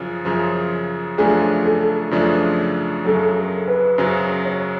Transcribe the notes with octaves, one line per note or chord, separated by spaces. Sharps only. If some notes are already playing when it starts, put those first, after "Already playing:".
Already playing: F#2 C#3 F3
F#2 C#3 F3
F#2 C#3 F3 A3 D4 G#4
A4
F#2 C#3 F3 A3 D4
F#2 C#3 F#3 A4
A#4
B4
F#2 C#3 F#3 C5
C#5